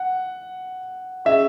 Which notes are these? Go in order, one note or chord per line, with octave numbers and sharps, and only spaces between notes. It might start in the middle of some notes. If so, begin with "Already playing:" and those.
Already playing: F#5
C#4 G#4 D#5 E5